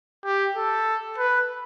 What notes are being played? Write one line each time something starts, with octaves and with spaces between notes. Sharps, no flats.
G4
A4
B4